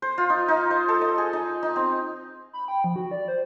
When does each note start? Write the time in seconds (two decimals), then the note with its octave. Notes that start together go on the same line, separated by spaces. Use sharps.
0.02 C5
0.18 F4
0.30 D#4
0.48 D#4
0.70 C5
0.88 A4
1.01 D#5
1.18 G#4
1.33 D#4
1.63 D#4
1.76 C4
2.53 B5
2.68 G5
2.84 F3
2.96 F#4
3.11 D5
3.28 C5